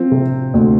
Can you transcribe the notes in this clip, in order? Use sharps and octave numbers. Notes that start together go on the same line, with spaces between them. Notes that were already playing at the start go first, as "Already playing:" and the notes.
Already playing: F3 C4
C3
D2